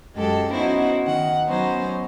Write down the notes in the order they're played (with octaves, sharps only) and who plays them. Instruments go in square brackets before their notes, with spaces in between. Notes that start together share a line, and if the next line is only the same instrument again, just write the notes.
[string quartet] F#2 G#3 G4 A4 A5
B3 C#4 D#4 E4 F#4 C5
D#3 F#5
F#3 B3 C#4 D#4 C5